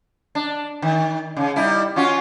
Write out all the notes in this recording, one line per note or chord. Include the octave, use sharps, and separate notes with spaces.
D4
D#3
C#3
G3 D#4 E4
C#4 F4 F#4